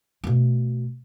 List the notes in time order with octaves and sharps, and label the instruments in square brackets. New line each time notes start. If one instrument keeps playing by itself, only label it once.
[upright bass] B2 A3